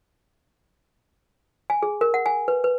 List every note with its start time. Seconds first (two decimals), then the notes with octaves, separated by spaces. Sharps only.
1.70 G#5
1.83 G#4
2.01 A#4
2.14 F#5
2.26 G#5
2.48 B4
2.64 B4